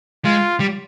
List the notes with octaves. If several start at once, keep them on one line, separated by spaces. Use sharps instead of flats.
G#3 F4
G3